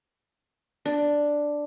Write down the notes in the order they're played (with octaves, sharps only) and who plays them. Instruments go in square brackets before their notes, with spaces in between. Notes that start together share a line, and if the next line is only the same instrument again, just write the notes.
[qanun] D4